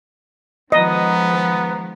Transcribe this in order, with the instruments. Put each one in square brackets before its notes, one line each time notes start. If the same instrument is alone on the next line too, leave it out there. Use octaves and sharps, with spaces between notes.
[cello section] D#3 F3 G#3 [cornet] B3 [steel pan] D#5 [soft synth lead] A#5